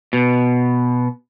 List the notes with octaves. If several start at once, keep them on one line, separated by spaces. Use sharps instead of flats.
B2